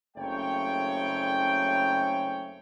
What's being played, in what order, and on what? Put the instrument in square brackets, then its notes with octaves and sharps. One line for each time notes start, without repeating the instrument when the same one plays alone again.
[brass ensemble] F#1 A3 C4 C#5 G5